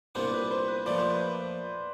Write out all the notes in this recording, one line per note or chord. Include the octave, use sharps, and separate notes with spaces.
C2 A#2 G3 B3 D4 C5
B4
C5
B4
A#2 F3 A3 C5 D5
C5
B4